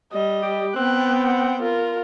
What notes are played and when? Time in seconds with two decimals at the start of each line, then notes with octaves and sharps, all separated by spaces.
0.13 G3 D#5
0.43 G4
0.76 B3 C4 G5 F#6
1.24 F#5
1.62 F4 A#4